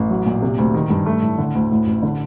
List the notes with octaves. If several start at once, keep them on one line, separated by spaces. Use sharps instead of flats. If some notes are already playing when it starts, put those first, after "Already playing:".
Already playing: A1
F#3
A#2
C3
D2
D#3
G2
A3
A2
D3
D2
A2
A1
D3